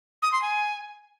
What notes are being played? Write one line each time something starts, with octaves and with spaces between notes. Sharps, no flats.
D#6
C6
G#5